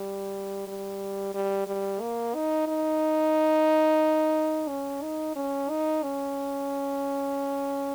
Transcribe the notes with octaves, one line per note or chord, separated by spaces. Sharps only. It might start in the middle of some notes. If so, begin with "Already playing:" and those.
Already playing: G3
G3
G3
G3
A#3
D#4
D#4
C#4
D#4
C#4
D#4
C#4